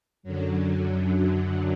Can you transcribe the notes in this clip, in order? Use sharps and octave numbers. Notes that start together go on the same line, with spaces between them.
F#2 D3 F#3